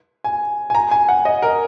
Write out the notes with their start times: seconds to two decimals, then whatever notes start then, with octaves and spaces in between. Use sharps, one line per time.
0.24 G#5
0.70 G#5
0.75 A#5
0.91 G#5
1.09 F#5
1.25 D#5
1.42 A#4